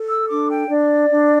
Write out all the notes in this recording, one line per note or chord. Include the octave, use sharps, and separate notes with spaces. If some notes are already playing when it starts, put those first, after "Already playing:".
Already playing: A4
E6
D4 D6
G5
D4 D5
D4